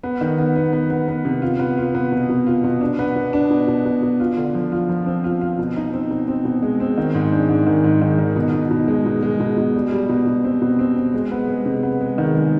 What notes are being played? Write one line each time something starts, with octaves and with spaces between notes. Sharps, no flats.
B3
D#3
B3
B3
B3
B3
B3
C3
F4
B3
F4
B3
B2
B2
F4
B2
D4
B3
B2
D4
B2
B2
B2
B2
F4
D3
F3
F4
F3
C4
F4
F4
B2
D#4
C4
B2
C4
B2
G#3
C4
D#3
G#2
D4
G#2
D#3
G#2
D#3
D#3
B2
B2
B2
G#3
B2
G#3
B2
B2
G3
G3
B2
B2
C4
B2
C4
C4
G#3
B3
G#3
C3
B3
G#3
D#3
G#3